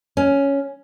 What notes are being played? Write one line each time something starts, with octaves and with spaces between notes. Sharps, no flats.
C#4